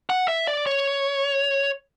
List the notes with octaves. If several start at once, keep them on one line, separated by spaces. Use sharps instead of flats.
F#5
E5
D5
C#5